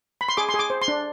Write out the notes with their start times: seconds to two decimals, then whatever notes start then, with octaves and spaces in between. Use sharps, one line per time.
0.21 B5
0.29 C6
0.37 G#4 D6
0.49 C6
0.54 G#4
0.59 D6
0.70 C5
0.82 C6
0.88 D4